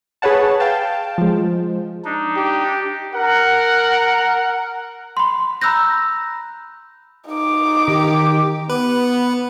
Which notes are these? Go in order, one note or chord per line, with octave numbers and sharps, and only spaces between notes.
G#4 B4 C#5 F#5 A5
F5 G5 A5
F3 G#3
D4 D#4
G4
A#4 F#5
B5 C6
A#5 B5 E6 F#6 G6 A#6
D#4 D6
D#3 G4
B3 B4